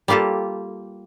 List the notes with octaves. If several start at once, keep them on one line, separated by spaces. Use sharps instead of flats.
G3 A#3 F4 G4 A4